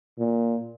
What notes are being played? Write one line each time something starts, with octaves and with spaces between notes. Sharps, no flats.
A#2